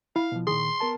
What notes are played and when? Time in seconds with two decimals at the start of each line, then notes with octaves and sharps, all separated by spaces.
0.16 E4 F5
0.32 B2 F3
0.47 A#2 D#3 G#4 C6
0.80 B3 A#4 A5